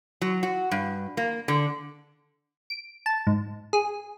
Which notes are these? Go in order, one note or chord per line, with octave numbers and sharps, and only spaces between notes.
F#3
F#4
G2
A#3
D3
D7
A5
G#2
G#4